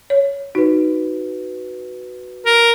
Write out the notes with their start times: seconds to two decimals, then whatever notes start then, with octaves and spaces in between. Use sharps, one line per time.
0.10 C#5
0.55 D#4 F#4 B4
2.46 A#4